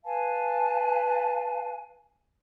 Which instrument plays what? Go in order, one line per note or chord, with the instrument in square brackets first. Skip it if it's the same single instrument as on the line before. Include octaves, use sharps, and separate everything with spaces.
[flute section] B4 F5 G#5 A5